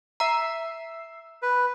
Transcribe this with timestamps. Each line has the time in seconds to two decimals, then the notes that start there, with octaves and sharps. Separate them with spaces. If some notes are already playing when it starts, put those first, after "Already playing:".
0.20 E5 A#5 E6 C7
1.42 B4